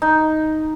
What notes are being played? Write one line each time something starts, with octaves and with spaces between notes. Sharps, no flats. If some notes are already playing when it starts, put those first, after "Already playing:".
D#4